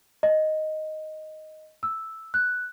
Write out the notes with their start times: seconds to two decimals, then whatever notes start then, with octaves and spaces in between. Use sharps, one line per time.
0.23 D#5
1.83 E6
2.34 F#6